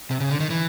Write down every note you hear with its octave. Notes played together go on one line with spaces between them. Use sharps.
C3
C#3
D3
D#3
E3